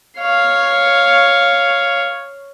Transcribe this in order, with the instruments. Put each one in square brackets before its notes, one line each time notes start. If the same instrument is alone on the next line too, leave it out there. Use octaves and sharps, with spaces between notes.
[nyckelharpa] C#5 F5